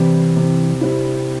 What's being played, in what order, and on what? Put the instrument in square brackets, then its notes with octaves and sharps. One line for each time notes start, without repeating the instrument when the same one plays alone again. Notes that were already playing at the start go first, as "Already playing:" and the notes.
Already playing: [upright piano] C3 G3 C4 E4 [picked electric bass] E3
[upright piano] C3
G3 C4 E4